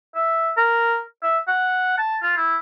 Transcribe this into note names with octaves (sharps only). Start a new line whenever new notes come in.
E5
A#4
E5
F#5
A5
F4
E4